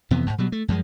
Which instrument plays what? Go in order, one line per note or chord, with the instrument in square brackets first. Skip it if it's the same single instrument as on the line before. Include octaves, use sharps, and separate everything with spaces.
[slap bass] F2 C3 E3 B3
E2 G#2
B2 F#3 G3
A3
F#2 F3 G#3